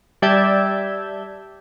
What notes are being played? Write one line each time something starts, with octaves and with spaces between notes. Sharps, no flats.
G3 D5 E5 A5 G6 G#6